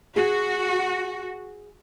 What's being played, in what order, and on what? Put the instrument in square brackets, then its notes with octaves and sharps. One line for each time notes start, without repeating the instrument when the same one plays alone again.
[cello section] F#4 [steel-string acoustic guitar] G#4